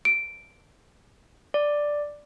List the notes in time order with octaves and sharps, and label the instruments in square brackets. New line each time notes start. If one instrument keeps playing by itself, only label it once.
[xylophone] D7
[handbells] D5